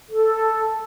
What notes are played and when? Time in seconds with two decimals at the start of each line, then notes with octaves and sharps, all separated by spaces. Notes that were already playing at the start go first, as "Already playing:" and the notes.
0.10 A4